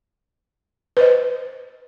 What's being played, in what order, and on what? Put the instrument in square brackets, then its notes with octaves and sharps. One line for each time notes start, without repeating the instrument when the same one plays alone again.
[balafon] B4 C5 D#5